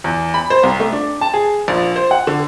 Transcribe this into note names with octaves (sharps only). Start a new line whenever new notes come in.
E2
B5
C5
C2
A3
D4
A5
G#4
A#1
C5
F#5
D3